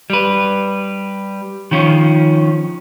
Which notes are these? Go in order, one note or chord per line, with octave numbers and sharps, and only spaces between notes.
G3 B4
D#3 F3 C#4